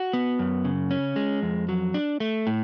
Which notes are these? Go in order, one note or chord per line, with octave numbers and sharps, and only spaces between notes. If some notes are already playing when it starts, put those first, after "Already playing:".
Already playing: F#4
B3
F#2
C#3
C#4
G#3
F2
F#3
D4
A3
A2